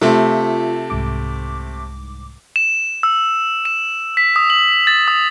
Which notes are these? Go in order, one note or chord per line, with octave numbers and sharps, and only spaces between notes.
C3 A3 F4
C2 G#2 D6
E7
E6
E7
B6
D#6
F#7
A6
D#6